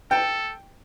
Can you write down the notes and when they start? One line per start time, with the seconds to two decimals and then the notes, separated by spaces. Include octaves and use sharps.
0.11 A4 G5